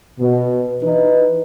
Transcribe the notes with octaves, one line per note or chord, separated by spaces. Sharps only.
B2
E3 D#4 B4